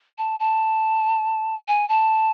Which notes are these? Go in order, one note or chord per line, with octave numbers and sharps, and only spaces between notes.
A5
A5
G#5
A5